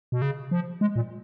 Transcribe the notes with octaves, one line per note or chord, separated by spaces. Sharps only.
B2
C#3
F3
G#3
A#2